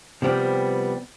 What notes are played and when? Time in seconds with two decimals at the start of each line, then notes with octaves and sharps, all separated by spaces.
0.22 C3 F3 G3 B3